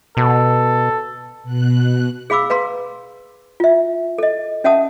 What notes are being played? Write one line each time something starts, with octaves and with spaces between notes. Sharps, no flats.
B2 A4
B2 F#6
G#4 F5 B5 D6 E6
B4 F5 A#5 C6
F4 E5
A4 D#5
C#4 E5 F#5 A5 D#6